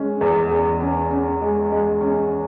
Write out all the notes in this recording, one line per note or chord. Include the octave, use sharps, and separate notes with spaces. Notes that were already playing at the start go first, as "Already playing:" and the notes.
Already playing: G#3 C#4
E2
E2
C#4
C#4
G#3
G#3
C#4